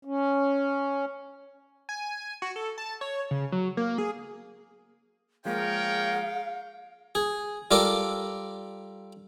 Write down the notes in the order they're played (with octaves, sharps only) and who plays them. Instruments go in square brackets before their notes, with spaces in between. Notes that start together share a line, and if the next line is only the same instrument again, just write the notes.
[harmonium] C#4
[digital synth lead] G#5
F#4
A4
A5
C#5
C#3
F#3
A#3
G#4
[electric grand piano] F3 G#3 A#3 [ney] G#4 [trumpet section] A#4 C#5 G5 [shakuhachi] F5
[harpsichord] G#4
G3 F4 A4 A#4 D5